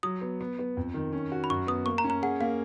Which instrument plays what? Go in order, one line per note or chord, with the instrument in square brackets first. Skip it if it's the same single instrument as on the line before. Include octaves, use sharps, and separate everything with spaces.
[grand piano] F#3 [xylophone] D#6
[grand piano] B3
B3
B3
F2
D#3
C#4
F#4
[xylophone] B5
[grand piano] F#2 [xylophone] C#6
[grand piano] B3 [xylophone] D#6
[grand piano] A#3 [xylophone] C#6
[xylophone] A#5
[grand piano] C#4
[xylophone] A#5
[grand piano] G#4 [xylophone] F#5
[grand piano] A#3 [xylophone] F5